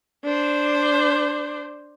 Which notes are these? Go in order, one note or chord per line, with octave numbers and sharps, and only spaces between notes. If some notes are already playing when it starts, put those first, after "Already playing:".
D4 C5